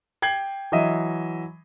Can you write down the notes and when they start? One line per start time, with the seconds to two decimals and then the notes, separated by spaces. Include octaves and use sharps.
0.22 G5 G#6 C7 F#7
0.72 E3 F#3 D#5 E5